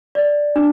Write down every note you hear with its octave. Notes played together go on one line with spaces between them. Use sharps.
D5
D4